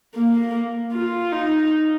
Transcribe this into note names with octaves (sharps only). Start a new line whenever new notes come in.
A#3
F4
D#4